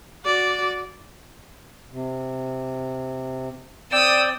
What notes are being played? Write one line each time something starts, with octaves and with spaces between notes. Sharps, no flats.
F#4 D5
C3
C4 D5 G5 D#6 E6